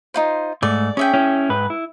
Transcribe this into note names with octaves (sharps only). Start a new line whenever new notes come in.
D#4 F4 C5
G#2 A3 D5
C#4 G#4 E5 G5
C#4 E4
G#2 B4
E4